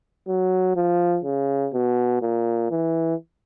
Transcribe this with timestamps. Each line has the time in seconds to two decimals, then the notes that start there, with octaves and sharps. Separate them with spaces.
0.27 F#3
0.76 F3
1.25 C#3
1.73 B2
2.22 A#2
2.71 E3